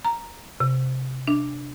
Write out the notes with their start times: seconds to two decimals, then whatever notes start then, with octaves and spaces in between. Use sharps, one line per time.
0.05 A#5
0.60 C3
1.27 D4